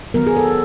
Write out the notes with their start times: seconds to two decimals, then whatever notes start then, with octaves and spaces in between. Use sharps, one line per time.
0.14 D#3 F#3 B3 A#4
0.27 G#4
0.37 A4